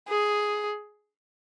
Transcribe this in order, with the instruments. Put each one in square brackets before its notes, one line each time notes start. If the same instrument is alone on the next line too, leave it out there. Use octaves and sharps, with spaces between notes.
[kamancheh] G#4